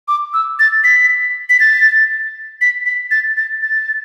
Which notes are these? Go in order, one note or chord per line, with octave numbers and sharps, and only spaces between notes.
D6
E6
A6
B6
B6
A6
B6
B6
A6
A6
A6